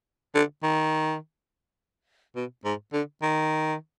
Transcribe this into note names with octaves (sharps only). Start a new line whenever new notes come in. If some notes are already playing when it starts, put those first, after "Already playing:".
D3
D#3
B2
G#2
D3
D#3